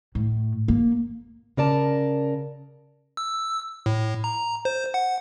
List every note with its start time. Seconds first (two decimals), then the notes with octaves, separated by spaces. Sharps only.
0.15 A2
0.68 A#3
1.57 C#3 A#4 D5 A5
3.17 E6
3.86 A2
4.24 A#5
4.65 C5
4.94 F#5